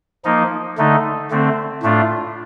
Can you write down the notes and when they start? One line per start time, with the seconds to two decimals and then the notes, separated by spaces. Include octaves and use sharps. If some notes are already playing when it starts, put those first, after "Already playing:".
0.25 F3 A#3 D#4
0.78 D3 A3 D#4
1.31 D3 A3 C4
1.83 A2 A3 D4 F4